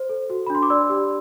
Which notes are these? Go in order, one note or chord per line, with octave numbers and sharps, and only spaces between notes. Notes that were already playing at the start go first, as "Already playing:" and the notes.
Already playing: C5
A4
F#4
B5
D4 C6
D6
D5 C6 E6
G4